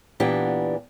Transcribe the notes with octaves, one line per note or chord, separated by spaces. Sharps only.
A#2 E3 B3 D4 G4